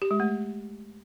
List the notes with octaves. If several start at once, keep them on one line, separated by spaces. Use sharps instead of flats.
G4
G#3
A3